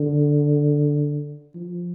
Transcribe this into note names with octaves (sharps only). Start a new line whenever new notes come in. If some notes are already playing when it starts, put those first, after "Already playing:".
Already playing: D3
F3